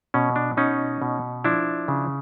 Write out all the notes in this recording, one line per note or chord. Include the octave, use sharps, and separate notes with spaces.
B2 C#4
D4
B2 C#4 D#4
B2
F3 D4 E4
C#3